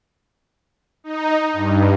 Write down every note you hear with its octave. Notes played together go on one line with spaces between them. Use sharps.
D#4
G2